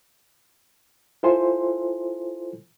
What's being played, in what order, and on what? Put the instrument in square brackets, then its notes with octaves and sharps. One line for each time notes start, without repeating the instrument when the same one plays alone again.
[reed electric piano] E4 F4 A4 C5 G#5 C6